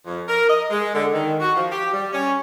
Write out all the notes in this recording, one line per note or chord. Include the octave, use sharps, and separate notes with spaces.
F2
A#4
D#5
G#3
D3
D#3
F#4
F3
G4
G3
C#4